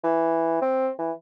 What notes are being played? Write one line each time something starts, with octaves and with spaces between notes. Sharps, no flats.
E3
C4
E3